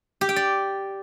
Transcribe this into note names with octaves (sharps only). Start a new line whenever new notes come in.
G4
G5
D5